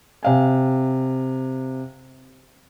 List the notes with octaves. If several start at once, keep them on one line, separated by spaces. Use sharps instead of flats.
C3 F5 G#5